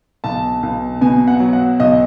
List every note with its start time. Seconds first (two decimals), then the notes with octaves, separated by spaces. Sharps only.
0.24 B1 A5
0.63 B1
1.01 B2 G#5
1.28 F#5
1.40 F#3
1.53 F#5
1.80 B1 D#5